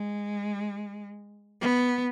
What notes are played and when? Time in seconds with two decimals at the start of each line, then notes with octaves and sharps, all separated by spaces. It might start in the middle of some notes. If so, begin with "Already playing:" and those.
Already playing: G#3
1.62 B3